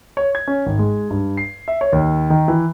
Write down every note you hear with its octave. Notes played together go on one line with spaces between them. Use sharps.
C#5
G#6
C#4
G#1
G#3
G2
C7
E5
C#5
D#2
D#3
E3